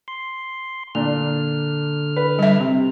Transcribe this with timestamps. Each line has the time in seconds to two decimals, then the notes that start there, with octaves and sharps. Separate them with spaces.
0.08 C6
0.95 A#2 D3 D4 F6
2.16 B4
2.39 G3 E5
2.60 C3